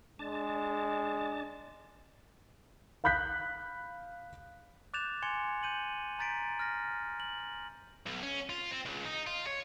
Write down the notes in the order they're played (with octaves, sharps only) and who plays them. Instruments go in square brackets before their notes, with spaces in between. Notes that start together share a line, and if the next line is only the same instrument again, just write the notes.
[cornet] G#3 [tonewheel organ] D4 A5
[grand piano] F5 B5 F#6 G6 B6
[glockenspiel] D6 F#6 G6 A6 E7 F7
G#5 C6 G#6 C#7 F7 G7
G6 D#7 F#7
A#5 G6 A6 B6 D7
F6 A6 A#6
F#7
[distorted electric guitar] B1
C#4
F4
C4
C#2
D#4
F4
C#5